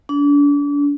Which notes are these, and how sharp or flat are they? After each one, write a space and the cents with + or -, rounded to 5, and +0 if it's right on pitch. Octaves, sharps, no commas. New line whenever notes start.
D4 -35